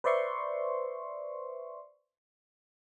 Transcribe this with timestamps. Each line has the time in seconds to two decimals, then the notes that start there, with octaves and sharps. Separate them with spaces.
0.04 B4 C5 D5 E5 C6 C#6